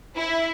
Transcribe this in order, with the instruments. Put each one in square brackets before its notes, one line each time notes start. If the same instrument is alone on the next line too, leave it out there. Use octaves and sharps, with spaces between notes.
[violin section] E4